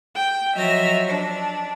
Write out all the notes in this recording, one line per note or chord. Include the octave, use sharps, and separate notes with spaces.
G5
F3 F#3 D#5 E5 F6 A#6
D4